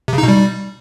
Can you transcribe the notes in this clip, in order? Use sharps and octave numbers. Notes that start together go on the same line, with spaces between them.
C3
C#3
D#4
B2
G3